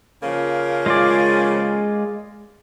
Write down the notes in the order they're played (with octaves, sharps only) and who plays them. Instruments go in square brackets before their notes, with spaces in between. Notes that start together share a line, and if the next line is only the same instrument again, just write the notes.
[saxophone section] C#3 F3 A#3
[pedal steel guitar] G#3 F4 D5